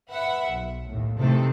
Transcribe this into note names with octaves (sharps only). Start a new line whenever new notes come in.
B4 E5 F#5
B1
D#2 A2
C3 D#3 E3 A3 C4 A4